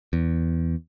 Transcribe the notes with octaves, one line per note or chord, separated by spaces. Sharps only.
E2